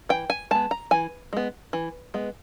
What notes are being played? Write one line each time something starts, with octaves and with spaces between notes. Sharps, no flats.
E3 G5
G#5
G#3 B3 A5
A#5
E3 G#5
G#3 B3
E3
G#3 B3